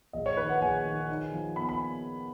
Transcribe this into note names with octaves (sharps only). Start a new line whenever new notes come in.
A#1 D#5
C#5
D#3 B4
F#5
A#1 G#5
D#3
D#4
F3
B3 B5
B5